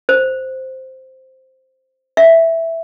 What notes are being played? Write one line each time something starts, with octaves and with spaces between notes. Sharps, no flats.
C5
E5